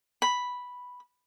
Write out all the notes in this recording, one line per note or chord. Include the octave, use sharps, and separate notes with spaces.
B5